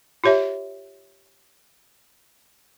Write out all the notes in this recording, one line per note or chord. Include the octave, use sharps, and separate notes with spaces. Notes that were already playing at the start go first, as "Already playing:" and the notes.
F4 G4 C#5 E5